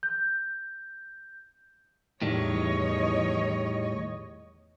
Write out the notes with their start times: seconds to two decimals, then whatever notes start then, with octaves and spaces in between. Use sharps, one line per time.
0.03 G6
2.22 E2 A2 D#3 G3 C#5 D#5